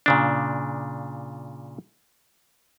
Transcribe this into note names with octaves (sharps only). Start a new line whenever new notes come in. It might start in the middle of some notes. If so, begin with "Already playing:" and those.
A#2 C#3 D4